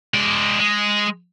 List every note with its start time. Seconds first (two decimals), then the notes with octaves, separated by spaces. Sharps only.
0.14 G#3 D5
0.60 G#3